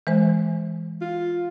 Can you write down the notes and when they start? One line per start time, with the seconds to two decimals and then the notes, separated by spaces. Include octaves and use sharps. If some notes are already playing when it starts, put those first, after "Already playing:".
0.07 E3 G#3 C5
1.01 F4